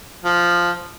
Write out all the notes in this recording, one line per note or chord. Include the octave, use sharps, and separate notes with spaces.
F3